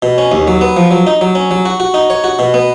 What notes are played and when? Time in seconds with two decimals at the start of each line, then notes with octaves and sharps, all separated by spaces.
0.02 B2
0.18 C#4
0.32 D#2
0.47 F#3
0.61 B3
0.77 F3
0.91 F#3
1.07 D#4
1.21 F#3
1.35 C#4
1.51 F#3
1.66 F#4
1.80 F#4
1.94 D#4
2.10 C#5
2.24 F#4
2.39 B2
2.54 B3